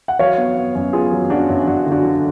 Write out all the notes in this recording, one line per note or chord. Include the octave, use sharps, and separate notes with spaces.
F#5
F#3 C#5 F5
B3
B3
F#2
B3 F4 G#4
F#3
F#2 D4 F#4
F#2
F#2 D4 F#4
D3
D4 F#4
D3